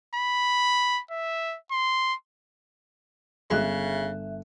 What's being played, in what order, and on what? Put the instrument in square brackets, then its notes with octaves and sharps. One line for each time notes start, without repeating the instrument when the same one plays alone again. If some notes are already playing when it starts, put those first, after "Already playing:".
[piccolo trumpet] B5
E5
C6
[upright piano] G1 F#6 [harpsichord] F2 F#3 G#3 [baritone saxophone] C#3 [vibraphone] E5